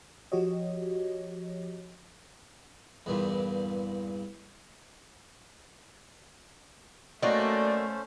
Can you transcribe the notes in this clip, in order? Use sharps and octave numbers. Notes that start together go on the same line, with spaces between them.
F3 F#4 G4 C#5 D#5
E2 G2 A#2
F#3 A3 A#3 C#4 F#4 C5 D5 D#5